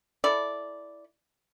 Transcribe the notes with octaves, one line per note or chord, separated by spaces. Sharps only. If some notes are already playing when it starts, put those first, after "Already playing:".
E4 A4 D5